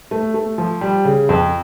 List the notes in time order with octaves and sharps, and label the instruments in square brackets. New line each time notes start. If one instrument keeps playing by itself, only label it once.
[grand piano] A3
A3
F3
G3
C#3
F2